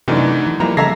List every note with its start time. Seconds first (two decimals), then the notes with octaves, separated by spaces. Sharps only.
0.08 F#2 C3 E3 A3 D4 D#4
0.47 E3
0.60 E3 F3 G3 A#3 A#5
0.77 C#3 A4 E5 A#5 G#6 A#6 C7